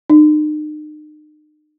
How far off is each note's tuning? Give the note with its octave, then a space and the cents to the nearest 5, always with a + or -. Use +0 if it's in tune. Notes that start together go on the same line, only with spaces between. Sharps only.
D#4 -40